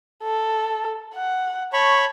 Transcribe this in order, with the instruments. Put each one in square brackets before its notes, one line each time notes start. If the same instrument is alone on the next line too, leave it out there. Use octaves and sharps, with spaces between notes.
[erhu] A4
F#5
[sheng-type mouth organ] C#5 B5 C#6 [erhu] A5